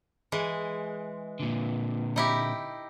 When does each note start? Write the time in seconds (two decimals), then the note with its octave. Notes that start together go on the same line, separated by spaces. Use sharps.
0.32 E3 G#3
1.40 A#2 D3
2.16 D#4 E4 G4